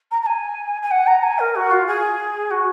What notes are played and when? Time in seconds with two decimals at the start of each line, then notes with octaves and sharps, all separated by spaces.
0.11 A#5
0.21 A#5
0.26 G#5
0.82 G#5
0.91 F#5
1.06 A#5
1.23 G#5
1.38 A#4
1.55 F#4
1.70 F4
1.86 G#4
2.50 F#4